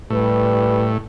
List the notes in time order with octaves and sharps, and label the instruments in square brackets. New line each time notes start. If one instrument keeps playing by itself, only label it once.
[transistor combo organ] A2 [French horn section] G3 B4